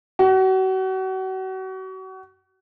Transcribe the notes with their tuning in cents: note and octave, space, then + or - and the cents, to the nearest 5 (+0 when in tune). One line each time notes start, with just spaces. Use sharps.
F#4 +35